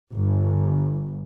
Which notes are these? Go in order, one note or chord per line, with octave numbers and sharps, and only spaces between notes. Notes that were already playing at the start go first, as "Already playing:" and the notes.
G1